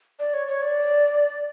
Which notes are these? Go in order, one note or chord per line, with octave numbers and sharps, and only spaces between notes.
D5
C#5
C#5
D5